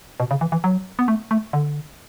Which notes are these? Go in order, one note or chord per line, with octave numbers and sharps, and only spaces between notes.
B2
C#3
E3
E3
F#3
B3
A3
A3
D3